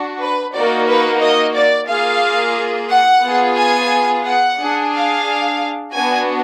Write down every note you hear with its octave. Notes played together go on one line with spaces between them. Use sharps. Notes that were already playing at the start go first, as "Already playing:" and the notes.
Already playing: D4 F#4
B4
A#3 D#4 F#4 D5
B4
D#5
D5
A#3 F4 G#4 F5
F#5
B3 F4 G#4
G#5
F#5
D4 G#4
F5
B3 D4 F#4 G#5